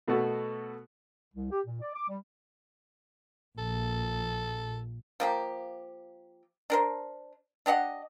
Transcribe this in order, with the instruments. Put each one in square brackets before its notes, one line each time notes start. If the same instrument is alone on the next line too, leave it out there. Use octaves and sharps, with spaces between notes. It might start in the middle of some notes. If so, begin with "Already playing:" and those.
[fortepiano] B2 A3 B3 F#4 A4
[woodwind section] C2
G4
A#2
D5
D6
G3
[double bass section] A#1 [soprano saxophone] A4
[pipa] F3 A#3 G4
D4 A#4 C5
D4 G4 D#5 F#5